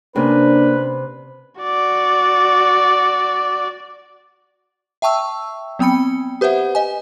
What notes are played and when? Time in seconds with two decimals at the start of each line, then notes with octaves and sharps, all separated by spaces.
0.16 C3 A#3 B3 C#4 D4 B4
1.61 F#4 D5
5.02 E5 G5 A5 C#6 E6
5.79 F#3 B3 C4 G5 B5 C#7
6.41 G4 B4 C5 E5 F#5
6.75 D#5 G#5